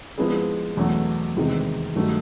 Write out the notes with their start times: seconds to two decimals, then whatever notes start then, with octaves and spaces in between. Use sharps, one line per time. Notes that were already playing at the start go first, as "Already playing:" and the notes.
0.18 F3 G#3 B3 E4 G#4
0.77 E2 B2 F#3 A3
1.36 E2 C3 D#3 G#3
1.95 G2 D#3 F#3 A3